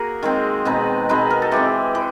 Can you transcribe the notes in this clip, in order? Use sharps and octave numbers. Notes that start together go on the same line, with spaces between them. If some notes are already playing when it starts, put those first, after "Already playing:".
Already playing: A#3 F#4 G#4 A#4
D#3 G#3 C4
B2 G#3 C4 D#4 B4
B2 G#3 C4 D#4 B4
A#4
A4
E3 G#3 C4 G4
E3